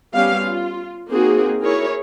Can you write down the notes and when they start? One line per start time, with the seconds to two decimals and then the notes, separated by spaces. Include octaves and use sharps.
0.14 G3 B3 C#4 G4 F5
0.42 F4
1.10 A#3 C4 D#4 F#4 G#4
1.60 E4 G#4 A#4 C#5